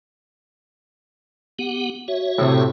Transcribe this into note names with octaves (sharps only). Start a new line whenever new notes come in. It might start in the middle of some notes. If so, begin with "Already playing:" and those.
B3 G4 F#5
F#4 C#5 E5
A2 C3